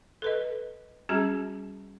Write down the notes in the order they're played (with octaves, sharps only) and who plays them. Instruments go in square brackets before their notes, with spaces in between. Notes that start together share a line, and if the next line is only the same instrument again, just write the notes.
[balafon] A4 B4 D#5
G3 C#4 F#4 G#4 A5 A#5